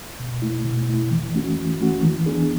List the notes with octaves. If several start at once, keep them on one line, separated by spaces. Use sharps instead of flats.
B2
A3 E4
B2
A3 E4
E3
A3 C#4 F#4
E3
A3 C#4 F#4
E3
B3 D4 G#4